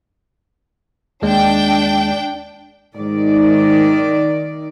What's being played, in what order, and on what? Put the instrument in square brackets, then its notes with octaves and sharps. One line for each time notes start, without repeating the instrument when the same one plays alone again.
[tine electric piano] D#2 G#3 [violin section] D4 G5
[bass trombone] G#2 [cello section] D#3 D5